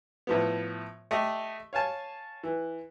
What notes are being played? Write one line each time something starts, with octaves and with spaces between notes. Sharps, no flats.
A2 F3 B3
A3 G4 D#5
C#5 F5 G#5 A5
E3